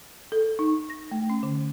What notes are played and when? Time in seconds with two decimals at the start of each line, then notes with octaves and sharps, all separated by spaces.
0.32 A4
0.59 D#4
0.90 A#6
1.11 A3
1.30 C#4
1.43 D3